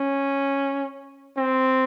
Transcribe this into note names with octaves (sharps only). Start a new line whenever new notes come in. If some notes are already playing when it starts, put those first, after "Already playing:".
Already playing: C#4
C4